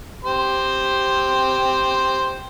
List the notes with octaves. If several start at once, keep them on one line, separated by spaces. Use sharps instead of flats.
G4 C5 C6